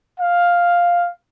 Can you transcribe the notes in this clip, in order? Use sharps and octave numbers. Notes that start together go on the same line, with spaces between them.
F5